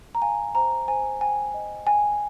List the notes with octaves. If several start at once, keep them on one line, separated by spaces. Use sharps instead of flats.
A#5
F5 G#5
C5 A#5
C5 G#5
G5 G#5
D#5
G5 G#5